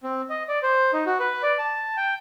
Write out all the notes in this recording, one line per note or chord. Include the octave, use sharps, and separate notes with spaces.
C4
D#5
D5
C5
D#4
F#4
B4
D5
A5
G5